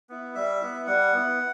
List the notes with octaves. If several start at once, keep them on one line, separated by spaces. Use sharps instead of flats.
B3 E4
G3 E5
B3 E4
G3 F#5
B3 E4